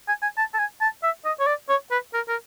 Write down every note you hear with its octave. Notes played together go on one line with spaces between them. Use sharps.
G#5
G#5
A5
A5
G#5
A5
E5
D#5
C#5
D5
C#5
B4
A#4
A#4